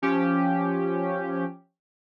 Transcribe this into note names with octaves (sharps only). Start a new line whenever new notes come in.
F3 C#4 G4